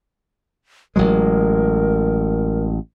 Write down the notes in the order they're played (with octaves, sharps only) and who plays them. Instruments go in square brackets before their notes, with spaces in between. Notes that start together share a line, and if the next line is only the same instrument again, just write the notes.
[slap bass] A1 F#3 G#3 [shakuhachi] A#4